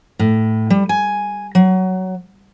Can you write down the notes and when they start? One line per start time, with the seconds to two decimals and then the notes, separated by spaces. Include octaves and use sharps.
0.19 A2
0.70 G3
0.89 G#5
1.55 F#3